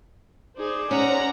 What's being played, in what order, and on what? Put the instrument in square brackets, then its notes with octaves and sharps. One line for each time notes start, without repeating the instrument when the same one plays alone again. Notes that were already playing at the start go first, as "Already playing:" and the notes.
[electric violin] D#4 G#4 [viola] C5 D5
[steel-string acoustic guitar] C#4 [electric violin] F#5 A#5